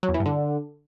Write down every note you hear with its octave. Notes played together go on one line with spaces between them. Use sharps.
F#3
E2
E3
G2
D3